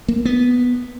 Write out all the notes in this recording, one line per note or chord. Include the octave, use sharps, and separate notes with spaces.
A#3
B3